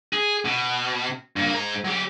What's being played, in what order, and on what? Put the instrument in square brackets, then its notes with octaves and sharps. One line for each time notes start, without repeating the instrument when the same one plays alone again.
[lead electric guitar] G#4
B2
G2 A#3
G#2 A#5
F#3 G4